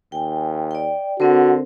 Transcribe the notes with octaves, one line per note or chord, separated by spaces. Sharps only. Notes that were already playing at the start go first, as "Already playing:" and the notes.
D#2 G5 G#5
D5 G5
D3 C4 F#4 A#4 C5